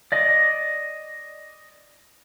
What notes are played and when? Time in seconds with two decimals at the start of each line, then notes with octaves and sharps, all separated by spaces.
0.12 D5 D#5